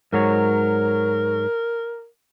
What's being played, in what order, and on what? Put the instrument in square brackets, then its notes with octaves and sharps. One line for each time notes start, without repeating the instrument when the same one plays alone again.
[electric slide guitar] G#2 F#3 C#5 [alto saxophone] A#4